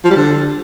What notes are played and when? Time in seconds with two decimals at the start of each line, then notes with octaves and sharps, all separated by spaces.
0.05 F3
0.10 G3
0.16 D3